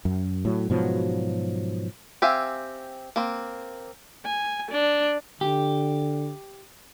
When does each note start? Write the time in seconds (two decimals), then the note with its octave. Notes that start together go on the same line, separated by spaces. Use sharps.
0.05 F#2
0.45 A2 F#3
0.70 G#2 B2 F3 F#3
2.22 C4 G4 E5 F5 G#5
3.16 A#3 C4
4.26 G#5
4.71 D4
5.41 D3 G4